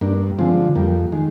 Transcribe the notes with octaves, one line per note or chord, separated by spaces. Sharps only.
G2 A#3 D4
D3 F3 G#3 C4
F2 G3 A#3
D#3 G#3